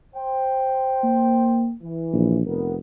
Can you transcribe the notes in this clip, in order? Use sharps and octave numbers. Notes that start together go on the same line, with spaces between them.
C5 G5
A#3
E3
A#1
F1 B3 A#4